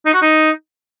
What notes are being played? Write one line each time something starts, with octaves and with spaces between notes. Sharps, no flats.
D#4
F#4
D#4